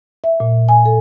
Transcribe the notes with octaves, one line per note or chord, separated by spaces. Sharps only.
E5
A#2
G#5
A4